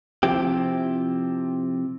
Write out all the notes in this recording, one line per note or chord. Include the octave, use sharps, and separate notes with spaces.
C3 F3 C4 E4 G4